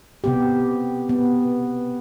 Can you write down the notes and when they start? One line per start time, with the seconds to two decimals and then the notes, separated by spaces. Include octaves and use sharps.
0.24 C3 B3 G4
1.09 B3